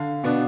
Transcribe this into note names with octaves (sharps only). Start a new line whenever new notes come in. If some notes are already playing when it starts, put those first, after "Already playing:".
Already playing: D3 F5
B2 B3 D4